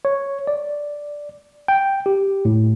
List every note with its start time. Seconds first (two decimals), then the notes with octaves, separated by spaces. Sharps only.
0.05 C#5
0.47 D5
1.68 G5
2.06 G4
2.45 A2